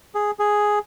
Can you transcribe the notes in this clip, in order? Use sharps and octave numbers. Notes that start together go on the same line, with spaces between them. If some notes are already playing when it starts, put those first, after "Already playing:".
G#4
G#4